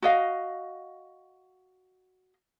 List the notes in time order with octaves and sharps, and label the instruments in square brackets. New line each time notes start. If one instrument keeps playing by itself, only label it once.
[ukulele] F#4 D#5 F5